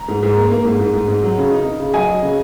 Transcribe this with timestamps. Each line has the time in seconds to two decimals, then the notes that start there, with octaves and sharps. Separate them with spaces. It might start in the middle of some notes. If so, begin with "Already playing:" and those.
Already playing: A#5
0.08 G#2
0.23 G#2
0.37 A#3
0.51 A#3
0.65 G#2
0.79 G#2
0.93 G#2
1.08 G#2
1.23 F#3
1.37 C#3
1.52 D#4
1.65 D#4
1.80 C#3
1.94 F#3 D#5 G#5
2.08 F#3
2.22 C#3